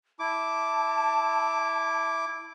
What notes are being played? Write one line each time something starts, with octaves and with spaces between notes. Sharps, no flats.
E4 A5 D6